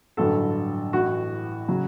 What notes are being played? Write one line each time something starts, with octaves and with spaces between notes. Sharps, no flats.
A1 G2 D3 F#3 A4
A1 A2 E3 F#4
C#3 F#3